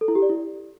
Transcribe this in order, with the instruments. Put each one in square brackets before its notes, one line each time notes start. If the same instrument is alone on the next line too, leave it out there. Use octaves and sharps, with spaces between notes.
[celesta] A4
E4
G4
D5
E4